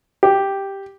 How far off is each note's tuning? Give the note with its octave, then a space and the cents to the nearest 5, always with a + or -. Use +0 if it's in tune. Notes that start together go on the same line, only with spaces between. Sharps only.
G4 +0